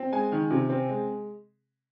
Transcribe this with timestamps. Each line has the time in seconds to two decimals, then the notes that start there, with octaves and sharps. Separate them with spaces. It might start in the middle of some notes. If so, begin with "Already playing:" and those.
Already playing: C4
0.12 G#3 G#5
0.32 D#3
0.50 C3
0.70 C4
0.89 G#3